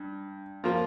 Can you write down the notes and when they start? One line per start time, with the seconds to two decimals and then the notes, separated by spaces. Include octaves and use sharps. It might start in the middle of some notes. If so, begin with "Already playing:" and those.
Already playing: G2
0.64 F3 A#3 F4